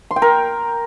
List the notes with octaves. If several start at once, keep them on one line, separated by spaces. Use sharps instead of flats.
C6
G5
A#4